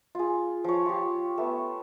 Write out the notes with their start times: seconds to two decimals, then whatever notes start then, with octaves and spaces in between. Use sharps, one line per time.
0.15 F4 G#4
0.64 F3 C#5
0.86 F4 G4
1.38 A3 B3